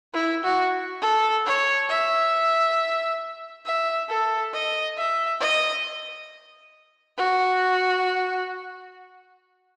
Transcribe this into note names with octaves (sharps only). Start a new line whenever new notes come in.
E4
F#4
A4
C#5
E5
E5
A4
D#5
E5
D#5
F#4